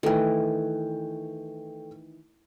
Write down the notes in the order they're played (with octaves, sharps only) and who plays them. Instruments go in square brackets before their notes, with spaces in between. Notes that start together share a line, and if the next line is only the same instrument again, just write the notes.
[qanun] D#3 E3 [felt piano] A3 G5